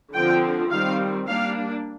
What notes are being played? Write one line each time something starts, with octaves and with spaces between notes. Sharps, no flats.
D3 F3 C4 G5
D#3 G3 C4 F5
G3 A#3 D4 F5